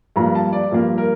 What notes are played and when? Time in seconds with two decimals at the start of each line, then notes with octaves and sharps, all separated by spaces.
0.16 G2 F3 A#3 A#5
0.35 A5
0.53 D5
0.71 G2 F3 A#3
0.98 A#4